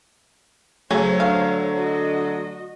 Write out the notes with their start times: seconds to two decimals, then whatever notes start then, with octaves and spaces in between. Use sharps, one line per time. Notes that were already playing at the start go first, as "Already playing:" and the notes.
0.91 C#3 F#3 A3 C#4 C5 C#5
1.20 D3 F5
1.76 F#4 D#5